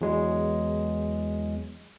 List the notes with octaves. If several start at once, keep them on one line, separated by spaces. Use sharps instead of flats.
E2 F#3 G#3